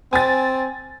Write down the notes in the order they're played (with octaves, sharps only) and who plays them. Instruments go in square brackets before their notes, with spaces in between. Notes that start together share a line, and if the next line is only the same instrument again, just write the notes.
[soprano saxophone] C4 [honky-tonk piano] G#5 A6